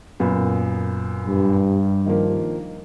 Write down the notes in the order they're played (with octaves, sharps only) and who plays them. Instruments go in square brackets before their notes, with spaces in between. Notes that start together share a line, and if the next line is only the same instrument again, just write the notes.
[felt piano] F#2 A#2 B3
[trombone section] G2
[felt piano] D#3 F3 A#3